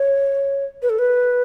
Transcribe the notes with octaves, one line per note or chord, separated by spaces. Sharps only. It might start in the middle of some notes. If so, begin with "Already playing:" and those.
Already playing: C#5
B4
A4
B4